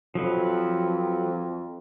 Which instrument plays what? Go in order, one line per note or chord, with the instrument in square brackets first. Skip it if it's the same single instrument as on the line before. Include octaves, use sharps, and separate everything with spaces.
[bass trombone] F2 [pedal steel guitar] F3 F#3 B4